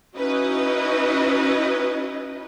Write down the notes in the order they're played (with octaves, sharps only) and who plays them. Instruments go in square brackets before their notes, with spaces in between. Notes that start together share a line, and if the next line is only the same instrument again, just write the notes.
[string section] C#4 D#4 E4 F#4 B4 D#5